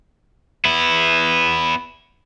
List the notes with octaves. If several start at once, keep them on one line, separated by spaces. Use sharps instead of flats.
B3 E4